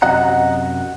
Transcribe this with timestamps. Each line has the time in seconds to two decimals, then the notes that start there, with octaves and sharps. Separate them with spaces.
0.02 F#2 C3 F#4 D#5 F#5 A#5